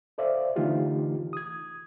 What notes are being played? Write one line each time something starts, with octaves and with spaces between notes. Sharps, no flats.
A4 C5 D5 E5 F5
D3 E3 A3 D#4 F4 G4
D#6 G#6